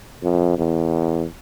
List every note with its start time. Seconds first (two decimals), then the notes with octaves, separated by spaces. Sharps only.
0.23 F2
0.58 E2